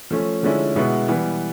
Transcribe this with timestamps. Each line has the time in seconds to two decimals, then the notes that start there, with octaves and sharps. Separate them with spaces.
0.11 F3 A3 C#4
0.43 D3 F3 G#3 C#4 E4
0.75 B2 G#3 B3 E4
1.08 E3 G3 B3